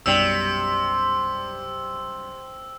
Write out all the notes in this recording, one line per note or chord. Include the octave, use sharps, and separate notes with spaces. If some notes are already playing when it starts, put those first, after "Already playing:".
B1 F#2 C3 G3 E6